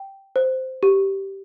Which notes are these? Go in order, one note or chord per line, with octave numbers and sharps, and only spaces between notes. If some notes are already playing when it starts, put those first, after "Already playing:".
Already playing: G5
C5
G4